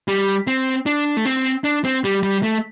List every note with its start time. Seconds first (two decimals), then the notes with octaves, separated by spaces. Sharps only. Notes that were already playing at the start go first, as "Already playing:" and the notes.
0.08 G3
0.47 C4
0.86 D4
1.17 A3
1.26 C4
1.64 D4
1.84 C4
2.04 G3
2.23 G3
2.43 A3